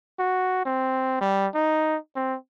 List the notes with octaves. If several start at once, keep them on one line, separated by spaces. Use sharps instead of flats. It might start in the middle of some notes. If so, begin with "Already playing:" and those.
F#4
C4
G3
D#4
C4